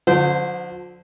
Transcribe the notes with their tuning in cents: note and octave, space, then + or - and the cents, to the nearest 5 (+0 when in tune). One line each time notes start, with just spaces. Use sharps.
D3 +0 F3 +45 C5 -20